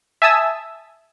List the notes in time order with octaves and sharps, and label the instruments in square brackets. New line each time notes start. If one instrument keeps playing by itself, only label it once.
[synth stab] E5 G#5 A5 D#6 E6